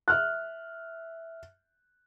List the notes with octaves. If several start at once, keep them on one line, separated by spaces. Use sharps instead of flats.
E5 F6 F#6